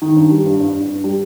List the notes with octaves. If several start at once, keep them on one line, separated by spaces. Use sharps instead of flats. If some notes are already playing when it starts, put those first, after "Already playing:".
D#3
G2
G3
G2
G2
G2
G2
G3